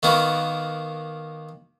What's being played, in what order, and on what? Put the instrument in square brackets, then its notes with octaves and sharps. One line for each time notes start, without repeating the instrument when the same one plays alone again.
[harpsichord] D#3 A#3 B3 F#4